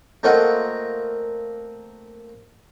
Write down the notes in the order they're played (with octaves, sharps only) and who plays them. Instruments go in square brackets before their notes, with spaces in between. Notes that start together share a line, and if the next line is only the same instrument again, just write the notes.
[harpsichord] A3 A#3 C4 F4 D#5 F#5